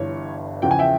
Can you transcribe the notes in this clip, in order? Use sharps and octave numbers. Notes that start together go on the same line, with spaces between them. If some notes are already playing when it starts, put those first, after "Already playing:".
Already playing: G1 G2 E3 C#5
E2 C#3 F3 G5
G#5
E5 G5